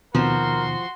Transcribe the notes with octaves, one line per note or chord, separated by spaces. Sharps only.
D#2 B2 D#3 F3 C4 F#4 A#4 C6